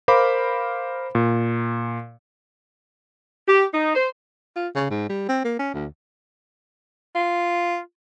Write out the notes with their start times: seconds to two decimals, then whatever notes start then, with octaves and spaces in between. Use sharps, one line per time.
0.08 A#4 C5 F5 B5 D6
1.15 A#2
3.47 G4
3.72 D#4
3.95 C5
4.56 F4
4.75 C#3
4.90 G#2
5.09 G3
5.29 C4
5.44 A#3
5.59 C#4
5.74 D2
7.16 F4